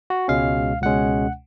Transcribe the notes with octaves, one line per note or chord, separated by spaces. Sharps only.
F#4
C#2 B2 G#3 C#4 F5
C#2 B2 G#3 C#4 F#5